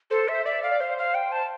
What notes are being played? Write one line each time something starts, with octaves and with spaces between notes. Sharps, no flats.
A4 C5
E5
C5
D5 E5
F5
D5
C5 F5
F5
G5
A5